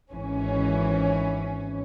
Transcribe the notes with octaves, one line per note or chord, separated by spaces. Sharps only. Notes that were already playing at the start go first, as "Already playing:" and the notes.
G#1 E3 C#4